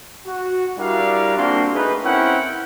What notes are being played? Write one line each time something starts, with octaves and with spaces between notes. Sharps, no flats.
F#4
G3 D4 E4 F#4 A#4 F5
A#3 C4 D4 F4 F#4 C6
A3 D#4 G#4 B4
C4 C#4 E4 A#4 F#5 G5